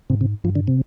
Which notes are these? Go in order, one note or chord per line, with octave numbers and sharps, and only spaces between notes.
G#2 C3
C3
G2 F3
D3
C3